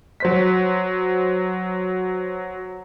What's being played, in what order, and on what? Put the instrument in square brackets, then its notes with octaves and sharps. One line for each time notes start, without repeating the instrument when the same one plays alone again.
[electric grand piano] F#3 C5 B6